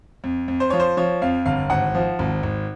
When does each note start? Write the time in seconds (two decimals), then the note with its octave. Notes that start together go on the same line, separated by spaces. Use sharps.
0.24 F2
0.48 F2
0.60 C5
0.70 F3 C#5
0.80 C5
0.97 F3 C#5
1.22 F2 F5
1.46 G1 F5
1.70 G#1 F#5
1.95 F3
2.19 G#1
2.43 G#1